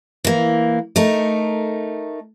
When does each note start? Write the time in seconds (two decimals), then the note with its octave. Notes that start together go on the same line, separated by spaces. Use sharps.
0.24 E3 A#3
0.96 A3 D#4 A#4